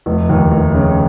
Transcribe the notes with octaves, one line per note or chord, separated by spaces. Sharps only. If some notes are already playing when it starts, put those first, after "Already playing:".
F1
D#2
F1
C#3